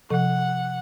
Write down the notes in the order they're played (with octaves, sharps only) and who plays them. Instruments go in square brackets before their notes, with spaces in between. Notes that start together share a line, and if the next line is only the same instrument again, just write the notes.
[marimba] C3 F3 A4 [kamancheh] F#5